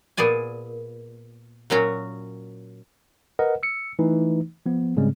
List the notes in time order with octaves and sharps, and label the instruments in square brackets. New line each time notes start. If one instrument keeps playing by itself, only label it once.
[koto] A#2 B3 G#4 D5 G#5
A#2 F#3 C#4 F#4
[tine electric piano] A#4 B4 D#5 F#5
E6 C#7
E3 A3 D#4
F3 B3
G#2 C#3 G3 G#3 C4